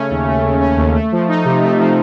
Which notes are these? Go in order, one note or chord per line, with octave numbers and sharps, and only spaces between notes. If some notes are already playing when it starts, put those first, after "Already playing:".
Already playing: C#3 A3 C#4
D#2
A3
C#3
C#4
D#2
A3
F3
D#4
C3
A3
F3